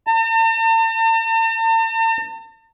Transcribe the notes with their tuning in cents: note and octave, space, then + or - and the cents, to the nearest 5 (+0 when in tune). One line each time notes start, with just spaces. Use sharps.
A5 +45